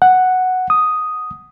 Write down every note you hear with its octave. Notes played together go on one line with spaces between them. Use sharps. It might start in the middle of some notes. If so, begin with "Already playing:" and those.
F#5
D#6